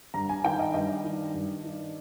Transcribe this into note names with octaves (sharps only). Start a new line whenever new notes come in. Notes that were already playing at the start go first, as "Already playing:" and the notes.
G2 A#5
G#5
D#3 G5
D#5
G2 D#5
D#3
G2
D#3